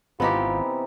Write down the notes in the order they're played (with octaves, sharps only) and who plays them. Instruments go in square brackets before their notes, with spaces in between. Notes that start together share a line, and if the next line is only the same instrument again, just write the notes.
[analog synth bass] G#1 [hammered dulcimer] C3 E3 A#5 [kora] B3 D#4 G4 [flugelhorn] F4